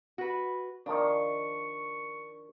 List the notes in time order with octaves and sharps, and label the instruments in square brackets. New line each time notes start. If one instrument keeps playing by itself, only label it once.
[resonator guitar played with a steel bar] F#4 B4
[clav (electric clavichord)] D#3 F3 A#3 [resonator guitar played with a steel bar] D4 [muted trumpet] C#6